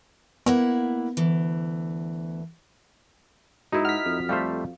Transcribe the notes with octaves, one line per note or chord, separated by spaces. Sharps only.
A#3 B3 E4 F#5
D2 E3
G#2 D#4 E4 F#4 A#4
F#5 F6 B6
F2 A4
G3 A3 C5 F5